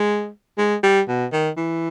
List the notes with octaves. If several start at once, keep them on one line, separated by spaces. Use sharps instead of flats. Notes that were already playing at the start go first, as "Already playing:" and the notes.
Already playing: G#3
G#3
G3
B2
D#3
E3